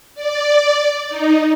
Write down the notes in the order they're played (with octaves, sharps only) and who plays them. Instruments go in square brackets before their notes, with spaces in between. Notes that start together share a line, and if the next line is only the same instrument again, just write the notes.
[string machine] D5
D#4